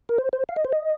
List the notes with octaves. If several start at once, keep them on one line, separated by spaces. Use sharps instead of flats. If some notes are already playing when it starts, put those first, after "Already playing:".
A#4
C5
C5
F5
D#5
C5
D#5